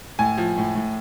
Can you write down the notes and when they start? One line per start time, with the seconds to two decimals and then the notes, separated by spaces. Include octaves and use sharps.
0.19 A2 G#5
0.38 F3
0.57 A2
0.75 A2